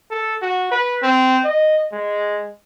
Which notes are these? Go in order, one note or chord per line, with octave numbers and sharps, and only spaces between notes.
A4
F#4
B4
C4
D#5
G#3